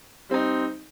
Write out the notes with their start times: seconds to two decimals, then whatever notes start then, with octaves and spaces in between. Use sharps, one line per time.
0.29 G3 C4 D#4